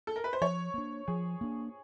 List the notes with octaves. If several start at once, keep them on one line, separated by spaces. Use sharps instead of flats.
A4
A#4
B4
C5
F3 C#5
A#3 D4
F3 G#4
A#3 D4